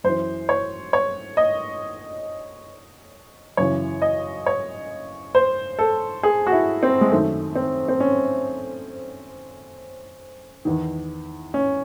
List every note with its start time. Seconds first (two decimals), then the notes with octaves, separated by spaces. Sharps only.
0.04 F#2 E3 C5
0.49 C#5
0.93 C#5
1.37 D#5
3.57 F#2 C#3 E3 C#5
4.02 D#5
4.46 C#5
5.35 C5
5.79 A4
6.23 G#4
6.47 F#4
6.52 E4
6.83 C4
7.01 G#3
7.11 F#2 D#3 A3
7.55 C4
7.88 C4
8.00 C#4
10.65 E2 D#3
11.54 C#4